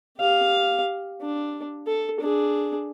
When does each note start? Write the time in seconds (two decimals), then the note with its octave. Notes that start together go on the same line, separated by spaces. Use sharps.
0.18 G4 F5
1.21 D4
1.87 A4
2.20 D4 G#4